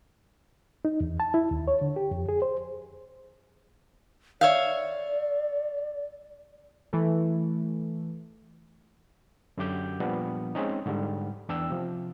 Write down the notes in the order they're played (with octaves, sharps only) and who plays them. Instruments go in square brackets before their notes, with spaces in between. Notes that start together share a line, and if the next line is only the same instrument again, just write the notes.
[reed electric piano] D#4
E2
A5
E4
D#2
C#5
D3
G4
F2
G#4
C5
[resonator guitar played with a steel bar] C#5 E5 F5 [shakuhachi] D5
[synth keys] E3 A3
[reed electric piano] F#2 D3 G4 D6 G6
A#2 F3 G3 B3 D4
G#3 C4 C#4 D#4
G#2 D3 G3
E2 D4 G5 E6
C3 F3